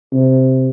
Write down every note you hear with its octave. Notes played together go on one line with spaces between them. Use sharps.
C3